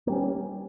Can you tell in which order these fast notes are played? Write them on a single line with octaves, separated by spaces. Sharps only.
A#3 G3 C#4